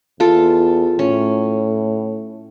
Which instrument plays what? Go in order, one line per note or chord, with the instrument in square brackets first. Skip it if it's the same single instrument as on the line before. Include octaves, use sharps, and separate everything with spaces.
[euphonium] E2 [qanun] F4 A4
[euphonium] A2 [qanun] C#4